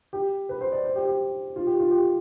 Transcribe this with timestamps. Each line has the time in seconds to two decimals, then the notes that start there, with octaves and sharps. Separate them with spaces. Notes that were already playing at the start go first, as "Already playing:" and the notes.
0.13 G4
0.49 B4
0.61 C5
0.72 D5
0.84 C5
0.96 G4
1.07 G4
1.56 F4
1.67 G4
1.79 F4
1.91 G4